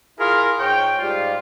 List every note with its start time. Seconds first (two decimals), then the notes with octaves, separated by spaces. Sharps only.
0.19 E4 F4 G#4 A#4
0.59 G#2 C#5 G5
0.99 G#2 G3 F4